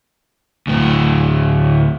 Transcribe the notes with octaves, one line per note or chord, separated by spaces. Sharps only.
D2 A2